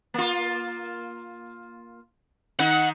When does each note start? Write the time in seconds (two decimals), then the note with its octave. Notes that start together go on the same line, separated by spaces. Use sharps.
0.14 A#3 F4
2.59 D#3 D#4 F#5